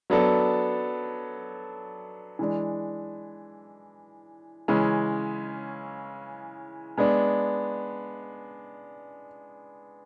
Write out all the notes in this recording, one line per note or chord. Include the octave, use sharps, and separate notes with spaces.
F#3 B3 D4 A4
E3 G#3 D4
C#3 E3 G#3 C#4
G#3 B3 D4